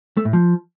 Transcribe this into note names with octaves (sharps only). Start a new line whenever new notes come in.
A3
A2
F3